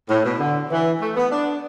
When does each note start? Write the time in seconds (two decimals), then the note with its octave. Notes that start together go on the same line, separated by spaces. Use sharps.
0.09 A2
0.24 B2
0.40 D3
0.71 E3
1.01 A3
1.16 B3
1.32 D4